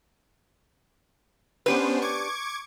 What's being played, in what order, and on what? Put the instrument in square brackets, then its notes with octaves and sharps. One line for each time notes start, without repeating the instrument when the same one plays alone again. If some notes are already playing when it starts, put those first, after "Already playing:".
[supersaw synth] B3 C#4 C5 [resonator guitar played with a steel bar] D4 G4 B4
[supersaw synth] C#6 D6 G#6